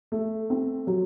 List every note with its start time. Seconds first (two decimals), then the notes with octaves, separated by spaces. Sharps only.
0.12 A3
0.50 C4
0.87 F#3